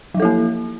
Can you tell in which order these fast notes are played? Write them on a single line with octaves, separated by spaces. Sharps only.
F#3 F3 A4 E4 A#3